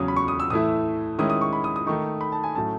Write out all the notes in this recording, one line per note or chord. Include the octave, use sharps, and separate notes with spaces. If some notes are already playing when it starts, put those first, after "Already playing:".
Already playing: E2 C#3 F#3 C#4 D#6
B5
C#6
D#6
E6
A2 E3 A3 E4 D#6
D#3 G#3 C#4 E4 D#6
D#6
C#6
B5
D#6
D#6
D#3 A3 D#4 C#6
B5
A5
G#5
A2 F#3 A3 C#4 A5